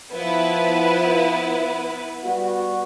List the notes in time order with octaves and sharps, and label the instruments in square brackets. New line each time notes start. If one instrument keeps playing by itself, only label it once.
[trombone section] F3 [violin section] B3 E4 B4
[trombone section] G3 B3 F#4